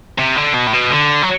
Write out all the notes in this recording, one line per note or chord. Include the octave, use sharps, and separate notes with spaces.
C3
D3
B2
A2
B2
D3
F#3